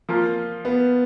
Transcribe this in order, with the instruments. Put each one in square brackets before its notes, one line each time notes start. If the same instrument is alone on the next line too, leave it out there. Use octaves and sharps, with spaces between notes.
[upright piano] F3 A#3 F4
[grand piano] B3